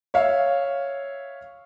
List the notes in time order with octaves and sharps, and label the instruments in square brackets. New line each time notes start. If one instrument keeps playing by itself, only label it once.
[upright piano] C#5 E5 F5